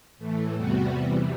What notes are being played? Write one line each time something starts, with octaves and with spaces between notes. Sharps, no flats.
A2 E3 A3
E2 C3 G3 B3 F#4
E2 C3 E3 G3